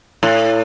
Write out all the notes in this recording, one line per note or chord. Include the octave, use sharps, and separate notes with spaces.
A2